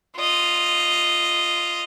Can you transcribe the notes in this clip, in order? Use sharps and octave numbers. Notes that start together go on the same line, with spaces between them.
F4 D#5